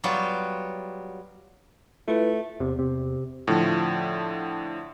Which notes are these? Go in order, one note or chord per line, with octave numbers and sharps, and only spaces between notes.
F#3 G3 B3 F4 F#4
A3 E4 F4 B4
E2 C3
C3
A2 D3 F3